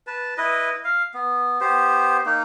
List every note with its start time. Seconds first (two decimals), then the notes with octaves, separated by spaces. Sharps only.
0.07 B4 A5
0.38 E4 B4 D#5
0.84 F5
1.14 B3
1.61 B3 G4 C5
2.26 A#3 D#4